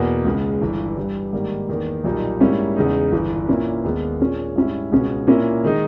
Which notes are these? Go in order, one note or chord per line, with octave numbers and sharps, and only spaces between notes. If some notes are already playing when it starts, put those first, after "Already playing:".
Already playing: E2 B2 A#3
C#2 C#3 G#3
G1 G2 E3
G2 E3 G3
G#2 D#3 G3 A#3
E2 D#3 A#3
B1 A#2 G3 A#3 D#4
G#2 G3 A#3 C#4 E4
E2 C#3 G#3 D#4
G1 G2 E3
A#2 A#3 C#4 E4
D#2 D#3 G#3 B3
A#2 G#3 C#4
G#2 G3 C#4 E4
C#2 B2 G#3 C#4
A#2 A#3 C#4 E4
D#3 G#3 D#4